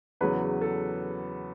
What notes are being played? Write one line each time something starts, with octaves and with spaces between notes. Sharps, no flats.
E2 C#3 F#3 B4
A4